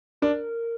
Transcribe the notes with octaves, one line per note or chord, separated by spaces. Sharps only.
D4 A#4